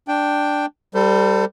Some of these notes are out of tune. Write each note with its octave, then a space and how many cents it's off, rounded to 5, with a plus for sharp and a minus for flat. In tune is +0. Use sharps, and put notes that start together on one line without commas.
D4 +0 G5 +0
G3 +0 A4 +30 C5 -25